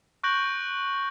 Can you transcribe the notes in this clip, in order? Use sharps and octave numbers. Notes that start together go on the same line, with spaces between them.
C#6 F#6 G6 A#6 D7 F#7